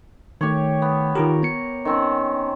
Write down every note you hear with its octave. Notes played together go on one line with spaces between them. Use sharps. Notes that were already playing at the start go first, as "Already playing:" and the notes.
D#3 A3 G4 C#5
B3
D#3 F4 G4 A#4
B3 C#7
D#3 C4 C#4